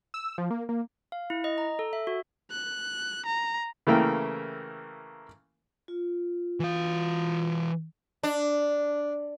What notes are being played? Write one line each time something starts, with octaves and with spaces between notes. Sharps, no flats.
E6
F3
A#3
A#3
F5
E4
D#5
A#5
A4
E5
F#4
F#6
A#5
C#3 E3 A3 A#3 G5
F4
E3 F5
D4